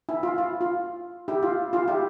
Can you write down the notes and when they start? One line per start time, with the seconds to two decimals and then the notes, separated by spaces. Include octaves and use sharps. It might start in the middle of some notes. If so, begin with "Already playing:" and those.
0.09 E4
0.23 F4
0.38 F4
0.61 F4
1.28 E4 G4
1.43 F4
1.73 F4
1.88 E4 G4